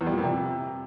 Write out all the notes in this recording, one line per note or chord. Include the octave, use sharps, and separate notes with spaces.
E2
G3
A#2
F2
C3